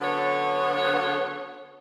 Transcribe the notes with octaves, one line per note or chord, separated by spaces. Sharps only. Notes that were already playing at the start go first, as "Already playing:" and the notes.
D3 F#3 B3 C#4 A4 C#5